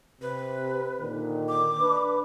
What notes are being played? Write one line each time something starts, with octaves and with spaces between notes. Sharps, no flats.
C3 B4
A#2 D3 D#3
D6
D4 B4